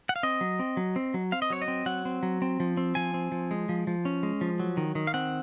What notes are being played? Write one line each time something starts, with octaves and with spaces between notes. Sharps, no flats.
F#5
F5
C4 D#5
F#3
C4
F#3
C4
F#3
C4 F5
D#5
F#3 C#5
D#5
C4
F#3 F#5
C4
F#3
C4
F3
C4
F3 G#5
C4
F3
G#3
F3
F3
C#4
G#3
F3
F#3
D#3
D#3
F5
C4 F#5